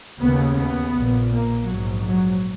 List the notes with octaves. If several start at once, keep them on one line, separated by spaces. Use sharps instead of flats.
D#2 C#3 B3
B3
A#1 A#2
A#3
A#1 G#2 F#3
F#3